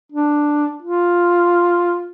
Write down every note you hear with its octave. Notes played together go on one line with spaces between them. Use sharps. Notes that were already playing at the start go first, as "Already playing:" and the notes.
D4
F4